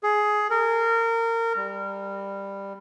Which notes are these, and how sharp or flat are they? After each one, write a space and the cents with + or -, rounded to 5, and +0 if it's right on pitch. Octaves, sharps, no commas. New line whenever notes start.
G#4 +15
A#4 -25
G3 +10